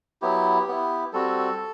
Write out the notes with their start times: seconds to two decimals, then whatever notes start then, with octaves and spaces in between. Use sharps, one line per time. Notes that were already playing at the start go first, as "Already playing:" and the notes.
0.22 F#3 B3 E4 G4
0.68 B3 E4
1.13 G3 C4 F#4 A4